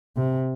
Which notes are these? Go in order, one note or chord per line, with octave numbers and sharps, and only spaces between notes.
C3